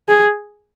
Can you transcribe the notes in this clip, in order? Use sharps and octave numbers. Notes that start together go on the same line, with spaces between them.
G#4